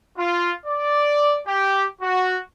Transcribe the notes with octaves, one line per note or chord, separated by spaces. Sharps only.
F4
D5
G4
F#4